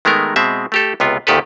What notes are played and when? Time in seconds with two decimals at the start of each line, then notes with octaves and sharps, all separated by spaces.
0.05 D#3 G#3 A3 B3 A#4
0.36 B2 G#3 C4 E5
0.72 A3 G4 A4
1.00 C#2 C3 B3 F4
1.27 D2 A#2 D#3 G4 A4 B4